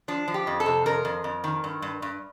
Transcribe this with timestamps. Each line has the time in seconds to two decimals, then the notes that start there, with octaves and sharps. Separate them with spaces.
0.08 F3 D4
0.28 F3
0.34 G4
0.47 F2
0.60 A4
0.66 C3
0.86 F2 A#4
1.05 F2
1.24 F2
1.44 D#3
1.64 G2
1.82 G2
2.02 G2